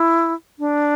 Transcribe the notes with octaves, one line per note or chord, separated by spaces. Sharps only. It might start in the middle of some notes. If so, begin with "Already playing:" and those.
Already playing: E4
D4